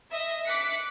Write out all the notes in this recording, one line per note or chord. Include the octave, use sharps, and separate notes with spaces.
D#5 E5
D6 F#6 B6 C#7